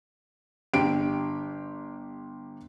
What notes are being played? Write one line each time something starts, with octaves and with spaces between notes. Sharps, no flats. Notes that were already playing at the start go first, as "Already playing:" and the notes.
G1 G4 D7